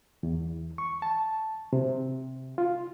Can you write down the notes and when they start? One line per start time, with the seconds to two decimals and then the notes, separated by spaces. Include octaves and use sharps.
0.23 E2
0.78 C#6
1.02 A5
1.73 C3
2.58 F4